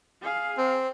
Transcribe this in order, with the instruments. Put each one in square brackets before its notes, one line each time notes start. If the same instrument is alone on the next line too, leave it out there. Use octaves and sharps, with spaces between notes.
[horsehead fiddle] G#4 F5
[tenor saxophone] C4